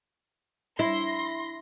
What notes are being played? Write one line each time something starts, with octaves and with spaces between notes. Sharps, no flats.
E4 C6 A#6